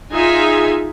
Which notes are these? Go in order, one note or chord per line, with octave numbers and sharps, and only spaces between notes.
D#4 F4 G#4 E5 G#5